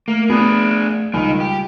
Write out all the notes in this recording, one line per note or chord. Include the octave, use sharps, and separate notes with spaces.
A3 A#3
B3 D4 G#4
C#2 D#3 G3 D#4
G4